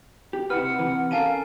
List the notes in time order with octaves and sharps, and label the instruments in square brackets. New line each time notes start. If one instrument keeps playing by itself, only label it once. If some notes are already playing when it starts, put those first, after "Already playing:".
[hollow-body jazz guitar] G4
[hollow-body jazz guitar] C3 E4 B4 [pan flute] F#5 [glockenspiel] F6
[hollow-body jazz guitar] C3 E3 B4
[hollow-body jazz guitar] C#4 A4 A#4 [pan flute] F5 [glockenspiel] G#5 A5 D#7